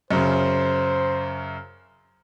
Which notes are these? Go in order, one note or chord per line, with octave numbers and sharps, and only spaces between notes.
F#2 C#3 C5